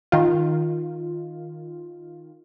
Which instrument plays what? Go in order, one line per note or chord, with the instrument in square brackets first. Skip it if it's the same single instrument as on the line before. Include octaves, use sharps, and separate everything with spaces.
[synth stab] D#3 F4